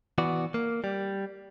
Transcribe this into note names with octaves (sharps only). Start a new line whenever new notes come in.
E3 B3 F#4 D5
A#3
G3